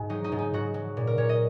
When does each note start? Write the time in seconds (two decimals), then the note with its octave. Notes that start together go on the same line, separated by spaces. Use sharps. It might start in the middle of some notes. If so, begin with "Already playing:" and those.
Already playing: G#2 F#4
0.09 F#3 D#4
0.24 D#4
0.32 G#2
0.39 D#4
0.53 G#2 F#4
0.74 F#3
0.97 A#2
1.07 A#4
1.17 A#2 C#5
1.29 D#5